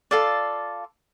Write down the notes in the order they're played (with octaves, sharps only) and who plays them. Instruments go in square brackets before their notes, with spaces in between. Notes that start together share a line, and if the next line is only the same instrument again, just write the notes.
[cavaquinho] F4 A4 D5 F5